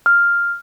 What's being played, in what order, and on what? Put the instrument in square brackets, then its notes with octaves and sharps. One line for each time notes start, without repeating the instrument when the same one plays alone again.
[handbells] F6